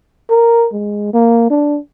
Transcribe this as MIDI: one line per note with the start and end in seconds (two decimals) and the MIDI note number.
0.30 0.67 70
0.73 1.13 56
1.13 1.50 58
1.50 1.79 62